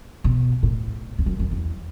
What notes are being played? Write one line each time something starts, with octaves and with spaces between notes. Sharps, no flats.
B2
A2
E2
F#2
F#2
E2